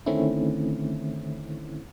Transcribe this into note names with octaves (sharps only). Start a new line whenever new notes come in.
D3 D#3 A3 C4 C#4 E4